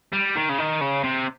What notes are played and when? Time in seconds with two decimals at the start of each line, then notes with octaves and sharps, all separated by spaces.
0.12 G3
0.35 D#3
0.49 C#3
0.58 D#3
0.81 C#3
1.03 C3